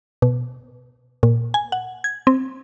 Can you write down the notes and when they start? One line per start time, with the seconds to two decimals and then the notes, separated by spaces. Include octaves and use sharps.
0.22 B2
1.23 A#2
1.54 G#5
1.72 F#5
2.04 G#6
2.27 C4